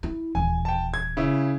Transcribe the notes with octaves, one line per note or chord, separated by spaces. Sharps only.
E4
D#1 E3 G#5
G5 A5
G#6
C#3 E4